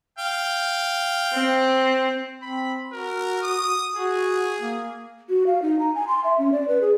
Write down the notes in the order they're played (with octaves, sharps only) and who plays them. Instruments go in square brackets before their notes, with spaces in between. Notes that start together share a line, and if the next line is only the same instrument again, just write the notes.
[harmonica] F5 G5
[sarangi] C4
[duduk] C4 [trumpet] B5
[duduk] F#4 [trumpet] A#4
[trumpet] D#6
[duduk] F#4 [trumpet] G#4
[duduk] A#3
[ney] F#4
F5
D#4
A#5
G#5
C6
E5
C#4
D5
B4
G#4